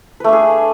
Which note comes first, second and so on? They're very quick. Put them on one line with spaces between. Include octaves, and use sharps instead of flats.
B4 A3 D4 G#4